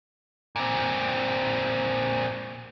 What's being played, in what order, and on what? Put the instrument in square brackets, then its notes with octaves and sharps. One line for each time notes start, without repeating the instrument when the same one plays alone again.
[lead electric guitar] A#2 C4